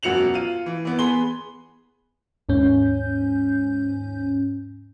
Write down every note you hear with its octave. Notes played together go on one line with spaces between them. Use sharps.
E1 F#2 F#4 C#7 F7 F#7
F4 D#7
E3
E3 B3
B3 G#4 B5 C6 G7
D#2 G#2 C#4 G6